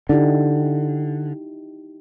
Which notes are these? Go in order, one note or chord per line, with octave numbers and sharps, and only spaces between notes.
D3 D#4 E4 G4